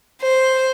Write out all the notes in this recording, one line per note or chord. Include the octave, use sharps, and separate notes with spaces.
C5